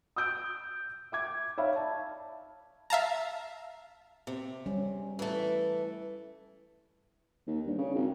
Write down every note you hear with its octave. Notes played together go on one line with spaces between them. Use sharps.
D#6 E6 G6 D7
E5 D6 G#6
D#4 C#5 D5 E5 F5 B5
A5
E5 F5 A5 A#5
C3
G3 C#4
E3 A3
D#2
G2
C#3
G#1